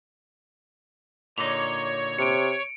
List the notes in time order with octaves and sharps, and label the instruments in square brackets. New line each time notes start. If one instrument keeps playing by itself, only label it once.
[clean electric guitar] A#2 D3 D#4 [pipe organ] C#5 [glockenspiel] F7
[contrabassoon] C3 [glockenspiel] C#7 D7